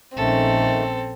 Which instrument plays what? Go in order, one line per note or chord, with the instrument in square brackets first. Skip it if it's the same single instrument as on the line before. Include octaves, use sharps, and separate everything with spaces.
[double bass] A#1 C#4 [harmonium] D#3 A3 [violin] C4 [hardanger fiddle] A4